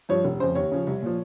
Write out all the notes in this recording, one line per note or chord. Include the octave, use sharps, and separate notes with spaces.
G2 F3 C#5
F1
F2 C#3 C5
D#2 C#5
C#3 F3
C2
A#2 F3